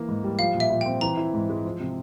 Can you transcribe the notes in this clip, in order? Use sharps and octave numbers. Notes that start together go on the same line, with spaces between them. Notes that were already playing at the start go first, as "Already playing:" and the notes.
Already playing: E3 A#3
G#2
G3
F3 F5
A#2
E5
A#2
C4 G5
E3 A#5
E4
G#2
G#3
F3
C3